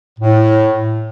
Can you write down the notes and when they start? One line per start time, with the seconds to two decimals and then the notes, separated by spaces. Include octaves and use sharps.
0.19 A2